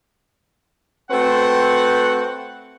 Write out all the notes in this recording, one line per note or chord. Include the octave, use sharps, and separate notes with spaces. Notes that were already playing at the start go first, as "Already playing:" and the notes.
A3 C4 F#4 B4 C5 F#5